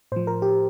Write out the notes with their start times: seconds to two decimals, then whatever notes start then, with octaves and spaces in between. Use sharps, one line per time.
0.12 A2 F3 C5
0.27 A#4
0.42 G4